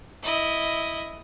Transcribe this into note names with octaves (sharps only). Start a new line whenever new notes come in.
E4 D#5